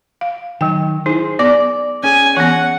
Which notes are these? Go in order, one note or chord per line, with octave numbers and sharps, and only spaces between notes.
F5
D#3 F#3 G5
D#4 E4 G#4 C5
B3 D5 D6
C#4 G#4 G#5
E3 B3 F#5